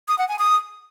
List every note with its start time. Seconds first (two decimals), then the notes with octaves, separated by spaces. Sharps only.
0.08 D#6
0.18 F#5
0.29 G#5
0.39 D#6